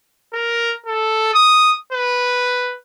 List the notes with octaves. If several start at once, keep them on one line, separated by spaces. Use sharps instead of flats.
A#4
A4
D#6
B4